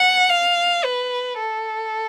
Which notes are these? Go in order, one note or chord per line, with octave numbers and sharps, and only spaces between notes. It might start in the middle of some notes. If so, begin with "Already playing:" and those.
Already playing: F#5
F5
B4
A4